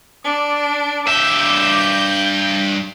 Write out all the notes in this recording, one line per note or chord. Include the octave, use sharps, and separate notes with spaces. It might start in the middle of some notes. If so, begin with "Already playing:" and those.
D4 D6
G2 E5 G6